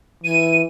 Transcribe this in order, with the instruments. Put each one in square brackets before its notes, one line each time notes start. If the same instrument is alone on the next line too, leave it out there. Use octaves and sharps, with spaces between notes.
[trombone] E3 [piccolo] D#7